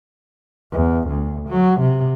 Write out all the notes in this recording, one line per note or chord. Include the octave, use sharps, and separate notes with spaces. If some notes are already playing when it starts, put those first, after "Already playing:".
E2
D2
F#3
C3